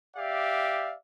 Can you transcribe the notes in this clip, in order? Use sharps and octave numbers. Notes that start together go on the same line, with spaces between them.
G4 D5 E5 F5